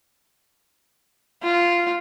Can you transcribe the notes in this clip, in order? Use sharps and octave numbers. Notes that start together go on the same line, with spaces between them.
F4